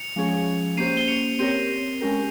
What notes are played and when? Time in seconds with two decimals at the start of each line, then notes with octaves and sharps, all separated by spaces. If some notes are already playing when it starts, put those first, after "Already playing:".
Already playing: C#7 F7
0.16 F3 G#3 C#4 G#4 C#5
0.77 A#3 C#4 G4 C5 C7 D#7
0.97 G7
1.08 C#7 F7
1.39 C4 G4 A#4 C#5 D#7 G7
2.01 G#3 C#4 G4 A#4